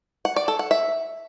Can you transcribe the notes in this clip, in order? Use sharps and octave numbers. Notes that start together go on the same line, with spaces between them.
F#5
D5
A4
F#5
E5